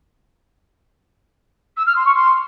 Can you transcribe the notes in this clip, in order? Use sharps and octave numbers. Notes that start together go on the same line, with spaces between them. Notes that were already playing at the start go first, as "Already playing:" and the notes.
E6
F6
C6
C#6
C6